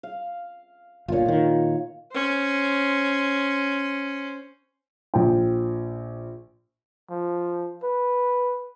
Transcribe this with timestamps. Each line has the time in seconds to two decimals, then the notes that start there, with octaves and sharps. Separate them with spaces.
0.03 F5
1.08 G1 A#2 F4 C#5
1.26 A#2 D#3
2.13 C#4 C5
5.14 A#1 G5
7.10 F3
7.83 B4